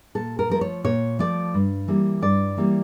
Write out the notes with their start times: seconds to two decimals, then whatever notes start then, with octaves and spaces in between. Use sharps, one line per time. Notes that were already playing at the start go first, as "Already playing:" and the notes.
0.15 A#2 A4
0.39 A#4
0.50 F3 A3 A#4
0.61 C#5
0.84 A#2 C#5
1.19 F3 A3 D5
1.54 G2
1.88 E3 G3 A#3
2.22 G2 D5
2.57 E3 G3 A#3